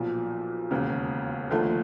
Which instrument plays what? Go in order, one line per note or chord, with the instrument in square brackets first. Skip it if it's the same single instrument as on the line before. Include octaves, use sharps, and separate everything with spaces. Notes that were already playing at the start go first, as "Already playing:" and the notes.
Already playing: [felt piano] B1 A#2 F3
E1 D#2 C#3
D#2 D3 F3 A3